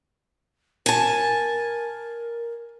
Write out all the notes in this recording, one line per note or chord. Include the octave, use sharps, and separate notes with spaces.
A#4 G#5 A5